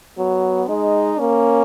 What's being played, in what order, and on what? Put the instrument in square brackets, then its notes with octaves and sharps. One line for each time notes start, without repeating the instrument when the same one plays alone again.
[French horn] F#3 [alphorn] B3
[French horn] G#3 [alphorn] D#4
[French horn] A#3 [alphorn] C#4